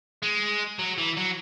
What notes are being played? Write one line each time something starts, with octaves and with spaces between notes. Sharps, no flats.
G#3
F#3
E3
F#3